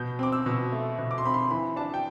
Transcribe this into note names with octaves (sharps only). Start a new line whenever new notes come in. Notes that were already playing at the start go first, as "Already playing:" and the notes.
Already playing: B2 G6
C4 D6
E6
B2
A3
B2
D6
C6
C4 B5
C6
E3 B5
D4 A5
G5